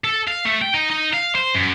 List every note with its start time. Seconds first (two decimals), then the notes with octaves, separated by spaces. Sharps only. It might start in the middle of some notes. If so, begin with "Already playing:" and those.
0.04 A4
0.28 F5
0.45 A3
0.62 G5
0.74 D#4
0.90 D#4
1.14 F5
1.35 C5
1.55 F#2